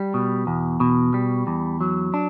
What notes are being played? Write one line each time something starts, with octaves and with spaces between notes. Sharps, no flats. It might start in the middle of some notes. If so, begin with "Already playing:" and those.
Already playing: G3
B2
E2
B2
G3
E2
F#3
D4